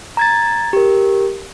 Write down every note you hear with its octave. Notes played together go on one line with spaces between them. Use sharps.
A#5 G#6 A6
G4 A#4